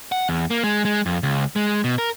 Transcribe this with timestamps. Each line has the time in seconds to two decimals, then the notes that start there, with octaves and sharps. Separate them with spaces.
0.12 F#5
0.29 E2
0.50 A#3
0.64 G#3
0.85 G#3
1.06 F2
1.23 C#2
1.56 G#3
1.84 B2
1.98 A#4